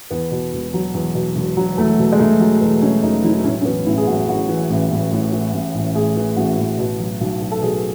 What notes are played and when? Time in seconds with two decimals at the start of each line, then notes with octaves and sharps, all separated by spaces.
0.10 E2 B3
0.31 B2
0.53 E1
0.74 F#3
0.94 E2
1.15 B2
1.35 E1
1.57 F#3
1.77 E2 A3
1.99 B2
2.12 G#3
2.19 E1 A3
2.40 F#3
2.61 E2 B3
2.82 B2 C#4
3.03 E1 D#4
3.24 F#3 E4
3.44 A2 C#4
3.61 C#4
3.65 E3 B3
3.86 A1 E4
3.97 G#4
4.07 A1 F#4
4.28 A2 F#4
4.49 E3
4.70 A1
4.91 A1
5.11 A2
5.32 E3
5.53 A1
5.75 A1
5.95 A2 G#4
6.16 E3
6.36 A1 F#4
6.57 A1
6.79 B2
6.99 F#3
7.21 B1
7.42 B1
7.51 A4
7.62 B2 G#4